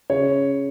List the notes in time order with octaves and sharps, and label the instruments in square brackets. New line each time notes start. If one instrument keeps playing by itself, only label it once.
[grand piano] C#3 C#5